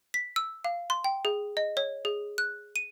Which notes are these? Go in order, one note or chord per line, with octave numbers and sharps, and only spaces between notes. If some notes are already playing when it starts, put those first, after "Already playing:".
B6
E6
F5
C6
G5
G#4
D#5
C#5
G#4
F#6
D#7